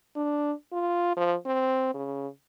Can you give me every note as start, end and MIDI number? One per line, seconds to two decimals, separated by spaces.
0.16 0.52 62
0.72 1.14 65
1.17 1.35 53
1.46 1.90 60
1.94 2.27 49